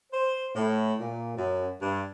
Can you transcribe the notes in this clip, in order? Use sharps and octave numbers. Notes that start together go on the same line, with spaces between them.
C5
A2
A#2
F#2
G2